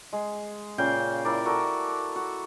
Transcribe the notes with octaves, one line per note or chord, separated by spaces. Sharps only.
G#3
A#2 C#3 F5 G5
E4 A#4 D5
F#4 A4 A#4
F#4